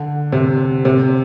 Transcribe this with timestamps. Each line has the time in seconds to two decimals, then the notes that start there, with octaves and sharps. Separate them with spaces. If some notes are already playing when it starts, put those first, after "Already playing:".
Already playing: D3
0.32 C3
0.85 C3